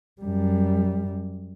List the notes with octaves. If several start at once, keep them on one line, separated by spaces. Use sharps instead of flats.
F#2 G3